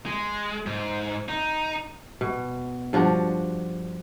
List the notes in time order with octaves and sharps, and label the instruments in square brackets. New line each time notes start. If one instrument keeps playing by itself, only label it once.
[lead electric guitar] G#3
G#2
D#4
[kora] B2
G2 F3 D4 F#4